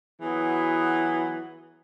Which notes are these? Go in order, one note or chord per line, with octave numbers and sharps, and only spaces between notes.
E3 F#3 B3 F#4 G#4